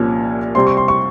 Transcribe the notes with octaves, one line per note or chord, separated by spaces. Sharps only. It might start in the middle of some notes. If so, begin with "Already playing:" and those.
Already playing: C2 A#2 F3 A#3 C#4
C3 G3 C4 C6
C#6
C6
C#6